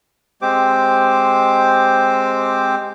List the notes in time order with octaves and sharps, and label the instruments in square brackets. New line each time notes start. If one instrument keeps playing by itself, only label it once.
[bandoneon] G#3 C4 G4 C5 D6